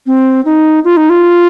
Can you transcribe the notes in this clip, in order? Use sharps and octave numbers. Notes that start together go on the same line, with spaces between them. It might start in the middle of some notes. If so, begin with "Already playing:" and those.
C4
D#4
F4
D#4
F4